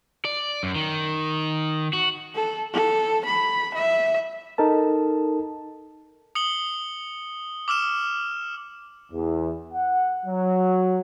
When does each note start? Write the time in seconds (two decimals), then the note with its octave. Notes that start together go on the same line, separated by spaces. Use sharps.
0.25 D5
0.63 F#2
0.76 D#3
1.93 F#4
2.35 A4
2.73 A4
3.26 B5
3.75 E5
4.58 D#4 A4 A#4 A5
6.35 D#6 C#7 F#7 G7
7.68 D6 E6 F6 E7
9.12 E2
9.73 F#5
10.25 F#3